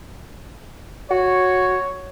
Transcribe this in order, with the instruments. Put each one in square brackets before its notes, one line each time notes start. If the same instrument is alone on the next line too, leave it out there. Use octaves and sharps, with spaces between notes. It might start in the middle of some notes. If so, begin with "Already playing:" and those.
[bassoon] F#4 [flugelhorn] C#5